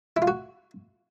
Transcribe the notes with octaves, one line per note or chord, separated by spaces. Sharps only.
E4
F4
F#4